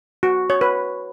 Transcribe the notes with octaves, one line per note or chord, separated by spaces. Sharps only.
F#4
C#5
B4